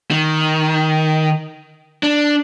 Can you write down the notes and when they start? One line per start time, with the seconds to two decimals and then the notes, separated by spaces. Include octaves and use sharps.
0.11 D#3
2.03 D4